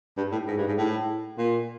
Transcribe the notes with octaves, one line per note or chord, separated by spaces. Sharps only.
G2
A2
G#2
G2
G#2
A2
A#2